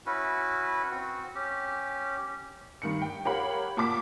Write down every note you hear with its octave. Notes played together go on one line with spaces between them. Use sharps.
C#4 E4 F#4 B4
C4 F#4
C#4 G4
G2 D#3 C#7
G5
G4 A#4 C#5 F5 F#5 B5
A#2 A5 D6 B6